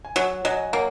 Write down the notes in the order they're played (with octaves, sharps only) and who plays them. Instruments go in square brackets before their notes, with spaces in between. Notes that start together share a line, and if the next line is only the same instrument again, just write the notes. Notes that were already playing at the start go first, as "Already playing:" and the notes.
[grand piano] G#5
[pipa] F#3 [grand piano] C#5 F#5
[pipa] F#3 [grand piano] D#5 G#5
[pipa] A#3 [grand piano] C#5 F#5